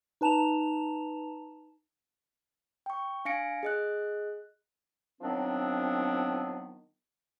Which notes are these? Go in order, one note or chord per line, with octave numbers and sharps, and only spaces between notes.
D#4 B4 A5 A#5 E7 F7
G5 C#6
D4 F5 G#5 A#6 C#7 D7
G#4 D#5 F#6
D#3 F3 F#3 B3 C4 D4